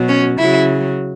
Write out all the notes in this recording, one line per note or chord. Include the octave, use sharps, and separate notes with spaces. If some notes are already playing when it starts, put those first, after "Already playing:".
Already playing: B2 F#3
C#4
C#3 F#3 E4